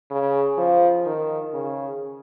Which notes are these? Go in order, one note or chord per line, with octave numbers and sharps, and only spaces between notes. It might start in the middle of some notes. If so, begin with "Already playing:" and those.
C#3
F3
D#3
C#3